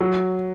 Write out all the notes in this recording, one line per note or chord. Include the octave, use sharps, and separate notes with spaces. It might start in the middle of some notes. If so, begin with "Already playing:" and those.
F#3